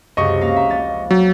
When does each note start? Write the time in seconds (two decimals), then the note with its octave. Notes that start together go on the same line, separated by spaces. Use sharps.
0.17 C#2 F#2 C3 D#5 C#6
0.41 A#3 F5 A#6
0.56 E5 A#5
0.69 F1 A#3 A6
1.11 F#3